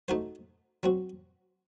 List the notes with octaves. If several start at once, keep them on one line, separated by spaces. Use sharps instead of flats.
A3 D#4 F#4 C5
F#3 C4 F#4